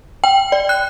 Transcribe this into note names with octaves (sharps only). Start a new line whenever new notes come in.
G5
D5
F#6